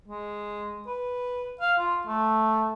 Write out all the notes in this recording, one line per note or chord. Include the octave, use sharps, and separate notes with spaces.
G#3
B4
F5
F4
A3